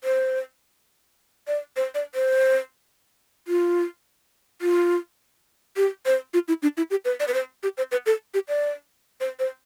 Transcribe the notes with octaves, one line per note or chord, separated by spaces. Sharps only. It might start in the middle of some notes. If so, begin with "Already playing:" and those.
C5
D5
C5
D5
C5
F4
F4
G4
C5
F4
E4
D4
E4
G4
B4
D5
B4
C5
G4
C5
B4
A4
G4
D5
C5
C5